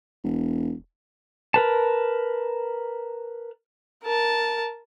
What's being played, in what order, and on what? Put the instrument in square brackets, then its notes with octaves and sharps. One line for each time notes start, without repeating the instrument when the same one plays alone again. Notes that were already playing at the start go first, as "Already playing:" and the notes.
[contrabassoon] E1
[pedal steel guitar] A#4 B4 A5
[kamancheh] A#4 A5